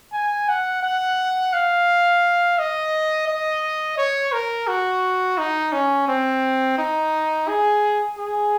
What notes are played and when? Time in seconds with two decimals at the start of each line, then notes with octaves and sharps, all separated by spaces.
0.13 G#5
0.49 F#5
0.83 F#5
1.53 F5
2.59 D#5
3.28 D#5
3.98 C#5
4.33 A#4
4.68 F#4
5.38 D#4
5.73 C#4
6.08 C4
6.78 D#4
7.48 G#4
8.18 G#4